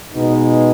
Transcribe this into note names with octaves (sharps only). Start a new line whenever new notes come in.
B2 G#3 B3 D#4